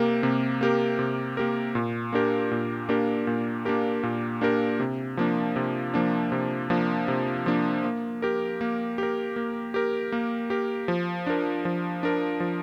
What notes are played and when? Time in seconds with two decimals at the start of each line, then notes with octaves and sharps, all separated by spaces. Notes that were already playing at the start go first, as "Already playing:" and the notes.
Already playing: C3 A#3 G4 A#4
0.23 C3
0.61 A#3 G4 A#4
0.99 C3
1.37 A#3 G4 A#4
1.75 A#2
2.12 A#3 D4 G4 A#4
2.51 A#2
2.89 A#3 D4 G4 A#4
3.27 A#2
3.65 A#3 D4 G4 A#4
4.03 A#2
4.41 A#3 D4 G4 A#4
4.80 C3
5.17 F3 A#3 D4
5.56 C3
5.94 F3 A#3 D4
6.32 C3
6.70 F3 A#3 D4
7.08 C3
7.46 F3 A#3 D4
7.84 A#3
8.22 G4 A#4
8.61 A#3
8.98 G4 A#4
9.36 A#3
9.74 G4 A#4
10.12 A#3
10.50 G4 A#4
10.88 F3
11.27 D4 A#4
11.65 F3
12.03 D4 A#4
12.40 F3